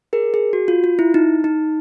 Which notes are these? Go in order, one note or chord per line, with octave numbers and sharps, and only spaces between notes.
G#4 A#4
G#4
F#4
F4
F4
E4
D#4
D#4